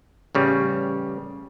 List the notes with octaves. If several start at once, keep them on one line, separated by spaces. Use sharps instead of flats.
A1 C#3 G3